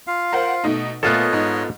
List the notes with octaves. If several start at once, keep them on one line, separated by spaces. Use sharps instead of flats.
F4 F5
A#4 C5 F#5
B2 A3 D#4
A#2 A3 B3 F4 A4 C#5 D#5
G#2